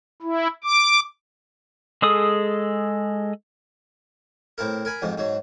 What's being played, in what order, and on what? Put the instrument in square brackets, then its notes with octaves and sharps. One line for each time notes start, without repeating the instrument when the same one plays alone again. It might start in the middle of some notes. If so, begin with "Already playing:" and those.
[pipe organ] E4
D6
[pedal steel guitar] G#3 G#4 A4 D#6
[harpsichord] A2 C4 E4 A#4
A#4 G#5 B5
F2 G#2 C3
G#2 F#3